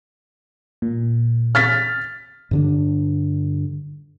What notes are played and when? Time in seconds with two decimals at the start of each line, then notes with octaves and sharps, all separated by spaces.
0.82 A#2
1.55 F6 A6 B6
2.51 G2 D3 D4